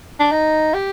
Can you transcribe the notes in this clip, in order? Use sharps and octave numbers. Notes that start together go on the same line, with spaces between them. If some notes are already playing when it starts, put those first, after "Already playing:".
D4
D#4
G4